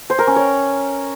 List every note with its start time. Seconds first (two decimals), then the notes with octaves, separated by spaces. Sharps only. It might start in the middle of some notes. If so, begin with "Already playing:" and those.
0.10 C5
0.19 A#4
0.27 C#4
0.36 C#5